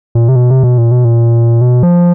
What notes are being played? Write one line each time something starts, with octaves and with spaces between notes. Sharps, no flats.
A#2
C3
B2
C3
B2
A#2
B2
A#2
B2
F3